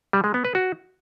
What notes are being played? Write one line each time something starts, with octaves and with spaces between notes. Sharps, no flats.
G3
G#3
B3
B4
F#4